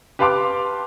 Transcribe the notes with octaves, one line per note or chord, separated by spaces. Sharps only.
G4 B4 F5 A5 C6 D6